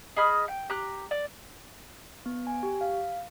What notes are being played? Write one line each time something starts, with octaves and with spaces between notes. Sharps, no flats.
G#4 D#5 B5 F6
G5
G4 A#5 F#6
D5
B3
G#5
G4
F5